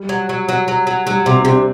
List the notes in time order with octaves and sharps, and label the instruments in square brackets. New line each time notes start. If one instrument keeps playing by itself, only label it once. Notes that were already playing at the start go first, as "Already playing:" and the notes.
Already playing: [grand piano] G3
[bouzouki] F#3
F#3
F#3
F#3
F#3
[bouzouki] F#3 [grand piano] G3
[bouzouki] C3 [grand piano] G3
[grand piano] C4
[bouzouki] C3
[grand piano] D4